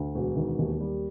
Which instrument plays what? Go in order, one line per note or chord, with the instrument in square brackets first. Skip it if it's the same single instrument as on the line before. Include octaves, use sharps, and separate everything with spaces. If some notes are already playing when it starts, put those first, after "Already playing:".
Already playing: [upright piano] D2
E1
D#3
D#2
G3